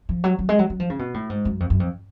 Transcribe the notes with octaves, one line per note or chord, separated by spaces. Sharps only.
F3
F#3
F#3
G#3
F#3
F#3
F3
C#3
B2
A2
G#2
F#2
F2
F#2
F2